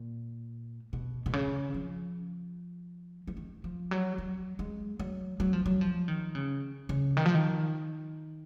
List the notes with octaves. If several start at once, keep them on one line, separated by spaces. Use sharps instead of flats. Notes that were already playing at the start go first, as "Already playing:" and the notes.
Already playing: A#2
B2
B2
C#3
F3
F3
D#3
F3
F#3
F#3
G#3
F#3
F#3
F3
F#3
F3
D#3
C#3
C#3
D#3
F3
D#3